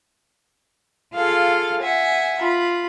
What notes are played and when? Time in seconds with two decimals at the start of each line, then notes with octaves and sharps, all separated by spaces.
1.13 F4 G#4 A4 F5
1.81 E5 F#5 G#5
2.37 F4 B5